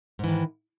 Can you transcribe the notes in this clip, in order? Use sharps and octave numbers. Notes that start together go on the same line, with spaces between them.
G#2 D#3 E3